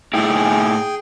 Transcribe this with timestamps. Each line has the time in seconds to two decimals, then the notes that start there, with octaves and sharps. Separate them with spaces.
0.14 A2 D#4 E4 G#4 G5 G#5